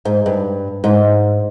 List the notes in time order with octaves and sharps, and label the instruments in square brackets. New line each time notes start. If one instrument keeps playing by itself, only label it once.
[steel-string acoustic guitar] G#2
G2
G#2